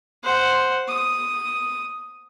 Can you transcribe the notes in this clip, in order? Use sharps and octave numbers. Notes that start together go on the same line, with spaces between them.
C5 F#5
D#6